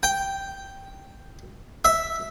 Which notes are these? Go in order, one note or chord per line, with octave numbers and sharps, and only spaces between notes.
G5
E5